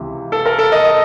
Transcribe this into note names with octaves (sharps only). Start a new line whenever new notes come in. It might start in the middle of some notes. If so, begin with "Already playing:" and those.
Already playing: C#2 C3 E3
A4
A#4
A4
D#5
D#5